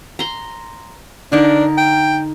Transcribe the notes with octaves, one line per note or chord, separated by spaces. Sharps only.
A#5 C6
D3 D4 D#4 A#4
G5